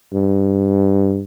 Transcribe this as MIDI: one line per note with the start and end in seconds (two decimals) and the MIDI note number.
0.14 1.23 43